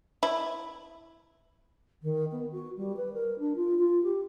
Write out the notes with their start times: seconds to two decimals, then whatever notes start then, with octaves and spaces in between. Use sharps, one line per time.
0.23 E4
2.03 D#3
2.32 B3
2.52 F#4
2.77 G3
2.97 B4
3.14 A#4
3.39 D4
3.56 F4
3.79 F4
4.03 G4